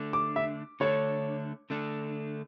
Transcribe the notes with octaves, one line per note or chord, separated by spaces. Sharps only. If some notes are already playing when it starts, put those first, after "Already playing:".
Already playing: D3 A3 D4
D6
E5
D3 A3 D4 C#5
D3 A3 D4